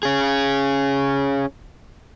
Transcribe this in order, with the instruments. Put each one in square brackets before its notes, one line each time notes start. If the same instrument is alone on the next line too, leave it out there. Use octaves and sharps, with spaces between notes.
[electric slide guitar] C#4 G#4